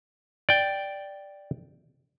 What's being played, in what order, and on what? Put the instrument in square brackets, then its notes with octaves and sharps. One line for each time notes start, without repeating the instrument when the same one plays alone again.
[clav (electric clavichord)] D5 G5